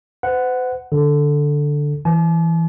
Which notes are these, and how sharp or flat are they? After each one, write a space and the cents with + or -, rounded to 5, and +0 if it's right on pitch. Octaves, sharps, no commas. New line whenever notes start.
C5 -45 F#5 +0
D3 +0 A4 +0
E3 +0 A5 -45